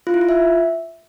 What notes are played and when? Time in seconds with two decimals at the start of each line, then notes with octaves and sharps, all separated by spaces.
0.07 F4
0.14 E4
0.21 F4
0.29 E5